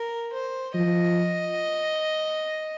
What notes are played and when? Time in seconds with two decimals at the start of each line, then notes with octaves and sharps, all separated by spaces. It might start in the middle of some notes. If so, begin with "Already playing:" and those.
Already playing: A#4
0.33 C5
0.74 F3 D#5